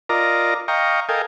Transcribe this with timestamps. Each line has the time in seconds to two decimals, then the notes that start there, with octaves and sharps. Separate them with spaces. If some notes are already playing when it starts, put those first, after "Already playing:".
0.09 F4 A#4 D5 D#5 A#5
0.68 D#5 F5 G5 A#5 C#6
1.09 A4 A#4 D#5 F5 G5 G#5